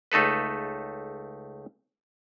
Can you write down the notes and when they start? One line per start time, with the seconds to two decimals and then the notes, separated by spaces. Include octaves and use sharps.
0.12 C#2 A3 D#4 A4 B4